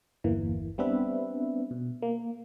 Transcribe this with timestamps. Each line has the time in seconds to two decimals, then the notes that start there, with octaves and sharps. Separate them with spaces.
0.24 G1 E2 E3 A#3
0.78 G3 B3 C4 D4 B4 E5
1.71 B2
2.02 A#3